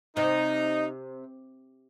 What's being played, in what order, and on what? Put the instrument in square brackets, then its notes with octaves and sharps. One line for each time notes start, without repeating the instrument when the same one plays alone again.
[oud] C3 [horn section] D#4